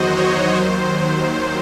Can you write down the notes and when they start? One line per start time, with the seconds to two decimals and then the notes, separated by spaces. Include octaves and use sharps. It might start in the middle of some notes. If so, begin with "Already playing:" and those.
Already playing: E2 D#3 F#3 F#4 C5 D#5
0.17 C#5
0.56 D#2 D#3 F#3 C5